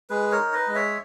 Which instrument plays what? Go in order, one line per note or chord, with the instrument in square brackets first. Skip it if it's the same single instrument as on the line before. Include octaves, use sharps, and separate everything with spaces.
[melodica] G#3 G#4 B4
A#4 C#5
D#4
B4 D#5
G#3
C#5 E5